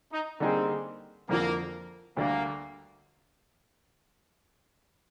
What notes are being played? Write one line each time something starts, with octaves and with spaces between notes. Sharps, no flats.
D#4
D3 G3 A#3 C4 D#4 G#4
F2 D3 F3 A#3
D2 D3 G3 A#3 D4